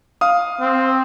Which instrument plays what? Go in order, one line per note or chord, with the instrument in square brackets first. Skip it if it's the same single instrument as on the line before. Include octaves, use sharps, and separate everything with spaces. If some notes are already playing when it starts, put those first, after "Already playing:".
[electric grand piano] F5 D#6
[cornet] C4